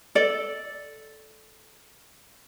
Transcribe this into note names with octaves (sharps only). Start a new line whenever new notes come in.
A4 D5